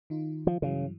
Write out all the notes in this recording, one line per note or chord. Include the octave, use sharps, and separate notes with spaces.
D#3 D#4 F4
F3
G2 C#3 E3 F#3